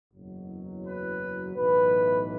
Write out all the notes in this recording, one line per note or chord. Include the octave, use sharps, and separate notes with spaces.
F#1 E2 B2 F#3
B4
B1 A2 E3 B4